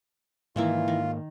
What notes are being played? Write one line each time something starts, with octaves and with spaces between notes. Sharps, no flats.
G#2 D#3 E3 A#3 E4 F4
D#3